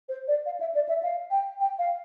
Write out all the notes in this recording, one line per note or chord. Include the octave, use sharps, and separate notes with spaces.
C5
D5
F5
E5
D5
E5
F5
G5
G5
F5